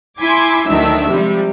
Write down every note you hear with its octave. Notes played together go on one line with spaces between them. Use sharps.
E4 G#5 C6 D6 G#6 B6
D2 D#3 F#3 D4 E5 E6
C3 F3 G3 G#3